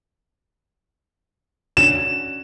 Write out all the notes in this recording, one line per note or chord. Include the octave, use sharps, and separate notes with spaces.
C#4 D4 F#4 E7